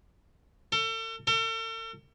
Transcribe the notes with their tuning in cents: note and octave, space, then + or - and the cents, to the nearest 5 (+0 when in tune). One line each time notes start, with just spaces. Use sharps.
A4 +40
A4 +45